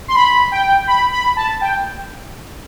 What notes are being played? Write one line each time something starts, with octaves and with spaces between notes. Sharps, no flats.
C6
B5
G5
B5
B5
A5
G5